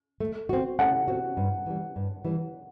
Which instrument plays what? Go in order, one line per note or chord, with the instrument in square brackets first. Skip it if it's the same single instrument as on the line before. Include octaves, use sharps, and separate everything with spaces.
[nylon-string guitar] A3
C4 F#4
[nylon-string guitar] A3 [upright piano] F#5
[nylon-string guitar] C4 F#4
G2
E3 G3
G2
E3 G3